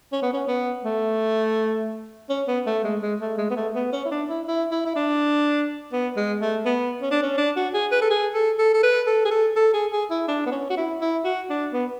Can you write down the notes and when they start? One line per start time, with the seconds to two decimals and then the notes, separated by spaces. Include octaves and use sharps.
0.12 C#4
0.22 B3
0.33 C#4
0.48 B3
0.85 A3
2.29 C#4
2.48 B3
2.66 A3
2.83 G#3
3.02 G#3
3.20 A3
3.38 G#3
3.50 B3
3.56 A3
3.75 B3
3.92 C#4
4.05 E4
4.11 D4
4.29 E4
4.48 E4
4.71 E4
4.86 E4
4.96 D4
5.92 B3
6.16 G#3
6.41 A3
6.65 B3
7.01 C#4
7.11 D4
7.22 C#4
7.37 D4
7.56 F#4
7.74 G#4
7.91 B4
8.01 A4
8.10 G#4
8.34 A4
8.59 A4
8.74 A4
8.83 B4
9.07 A4
9.25 G#4
9.31 A4
9.56 A4
9.73 G#4
9.92 G#4
10.10 E4
10.28 D4
10.46 B3
10.52 C#4
10.70 F#4
10.77 E4
11.01 E4
11.24 F#4
11.49 D4
11.73 B3